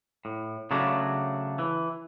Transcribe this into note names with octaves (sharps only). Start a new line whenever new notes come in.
A2
C#3 F#3 A3 D4
E3